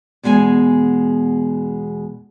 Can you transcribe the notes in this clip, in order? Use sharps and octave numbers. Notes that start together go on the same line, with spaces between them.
E2 B2 G#3 G4 G#5